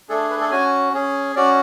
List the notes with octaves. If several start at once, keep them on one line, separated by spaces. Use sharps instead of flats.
A3 D4 G#4 A4
B4
A4
C#4 F#4 G#5
C#4 G#4
C#4 F#4 D5